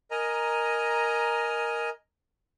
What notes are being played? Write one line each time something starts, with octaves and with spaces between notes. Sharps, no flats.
A#4 D#5 G#5 A#5